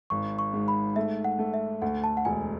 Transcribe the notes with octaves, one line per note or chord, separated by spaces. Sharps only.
G#1 C#6
C#6
G#2
B5
A3 E5
F#5
A3
E5
D2 F#5
A5
F#5
E1 G#5